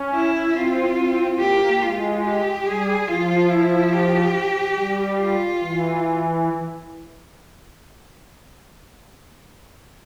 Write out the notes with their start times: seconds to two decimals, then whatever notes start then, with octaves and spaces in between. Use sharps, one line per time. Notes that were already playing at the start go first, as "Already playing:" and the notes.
Already playing: C#4
0.14 E4
0.55 C4 F4
0.97 C4
1.39 A#3 G4
1.82 G#3 F4
2.24 G4
2.66 G3 G#4
3.08 F3 F4
3.50 E4
3.92 G4
4.77 G3
5.19 F4
5.61 E3